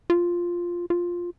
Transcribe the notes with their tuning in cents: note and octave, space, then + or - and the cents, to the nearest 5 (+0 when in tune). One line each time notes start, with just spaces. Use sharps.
F4 +0
F4 +5